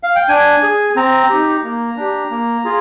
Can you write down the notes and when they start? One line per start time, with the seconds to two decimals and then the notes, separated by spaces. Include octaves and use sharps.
0.03 F5
0.16 G5
0.28 D4 G#5
0.63 G#4
0.96 C4 A#5
1.29 D#4 G4
1.63 A#3
1.97 D4 G4
2.30 A#3
2.65 F4 G#4